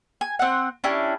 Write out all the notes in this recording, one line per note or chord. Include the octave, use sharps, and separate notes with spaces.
G#5
C4 F#5
C#4 D4 E4 G4